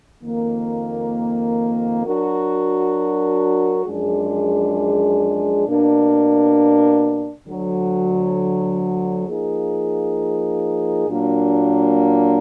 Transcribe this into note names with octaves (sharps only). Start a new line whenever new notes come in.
F2 D#3 A#3
F#3 D4 F#4 A#4
F#2 F3 G#3 D4 G#4
B2 A#3 D4
D2 D3 F#3
F3 A#3 D#4 G#4
A#2 F#3 A#3 D4